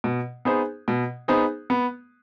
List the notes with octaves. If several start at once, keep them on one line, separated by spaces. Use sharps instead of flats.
B2
B3 D#4 G#4 C5
B2
B3 D#4 G#4 C5
B3